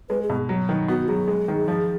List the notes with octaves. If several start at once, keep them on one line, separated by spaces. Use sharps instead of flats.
G#3 B4
G#4
B2
F#3
D#3
B3 F#4
F#3 G#4
G#3
D#3
F3